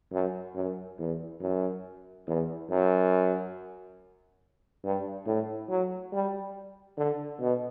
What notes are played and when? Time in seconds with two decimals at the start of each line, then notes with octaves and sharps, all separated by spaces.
0.12 F#2
0.55 F#2
0.98 E2
1.41 F#2
2.27 E2
2.70 F#2
4.84 G2
5.27 A2
5.69 F#3
6.13 G3
6.97 D3
7.40 B2